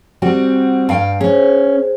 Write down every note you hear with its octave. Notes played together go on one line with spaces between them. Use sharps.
G3 C4 F#4
G2 F5 G5
C#4 G#4 C5